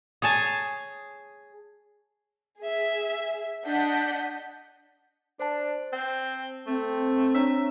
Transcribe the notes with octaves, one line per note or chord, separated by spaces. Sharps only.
G#4 C#5 G#5 A5
G#4 E5
D4 D#5 F#5 G6 B6
D4 C5 A5
C4
A3 C4
D4 C#5 E5 A#5